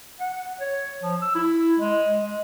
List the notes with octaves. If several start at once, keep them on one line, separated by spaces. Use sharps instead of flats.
F#5
C#5
F3
E6
E4
G#3
G#3